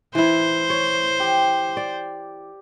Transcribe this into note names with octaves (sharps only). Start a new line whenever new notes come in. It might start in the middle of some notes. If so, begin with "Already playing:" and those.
E3 E4 C5
C#5
G4
D5